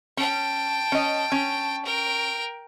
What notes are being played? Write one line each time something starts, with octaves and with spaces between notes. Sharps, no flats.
C#4 G5 A5
C#4 D#5
C#4
A#4 G5